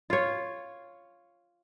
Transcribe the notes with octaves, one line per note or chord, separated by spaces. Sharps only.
F4 C#5